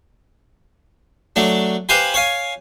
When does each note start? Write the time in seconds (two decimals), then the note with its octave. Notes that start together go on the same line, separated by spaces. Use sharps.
1.36 F#3 A3 D4
1.89 G4 B4 C5 F5 G#5 B5
2.14 C#5 F5 G#5